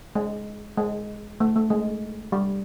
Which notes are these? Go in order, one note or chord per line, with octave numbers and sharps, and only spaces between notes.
G#3
G#3
A3
A3
G#3
G3